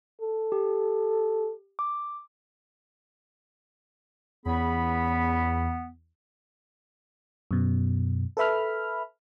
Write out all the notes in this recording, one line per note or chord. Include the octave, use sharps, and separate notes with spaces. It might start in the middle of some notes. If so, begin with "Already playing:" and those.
A4
G4
D6
E2 B3 C#4 G#4 B5
F#2 B2
A4 B4 E5 B5 F6